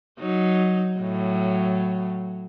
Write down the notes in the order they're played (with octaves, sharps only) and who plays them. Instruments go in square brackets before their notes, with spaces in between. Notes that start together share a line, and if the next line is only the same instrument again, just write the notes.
[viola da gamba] F#3 D#4
A2 F#3